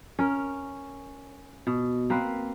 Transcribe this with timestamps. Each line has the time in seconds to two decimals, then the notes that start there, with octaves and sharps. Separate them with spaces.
0.19 C#4 A#4
1.67 B2
2.10 A#3 C4 B4